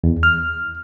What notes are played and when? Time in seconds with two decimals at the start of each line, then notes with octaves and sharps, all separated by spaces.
0.04 E2
0.23 F6